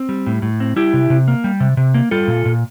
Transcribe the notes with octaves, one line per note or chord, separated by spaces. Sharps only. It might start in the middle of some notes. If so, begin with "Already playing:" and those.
Already playing: C4
G3
A2
A2
C4
G3 E4 G4
C3
C3
A#3
G3
C3
C3
A#3
G3 F4 A4
A#2
A#2